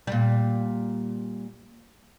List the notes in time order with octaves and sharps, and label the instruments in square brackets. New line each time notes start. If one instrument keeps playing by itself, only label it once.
[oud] A#2 G3